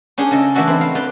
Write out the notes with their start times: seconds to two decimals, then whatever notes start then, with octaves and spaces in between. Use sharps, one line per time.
0.18 C#4 D4 G4 G#4
0.31 C#3 A4 D#5 A5
0.55 E3 A3 D4 F#4 A4
0.67 C4 E4
0.81 F5
0.95 G4 B4 D5